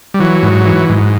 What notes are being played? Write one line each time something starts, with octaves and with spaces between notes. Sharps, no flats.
G3
E3 F#3
G#2
E3
G#2